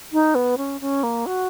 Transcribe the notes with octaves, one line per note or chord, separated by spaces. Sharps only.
D#4
B3
C#4
C#4
A#3
F#4